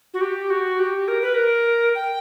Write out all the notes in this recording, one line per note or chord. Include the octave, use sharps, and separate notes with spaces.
F#4
G4
F#4
G4
A#4
B4
A#4
G5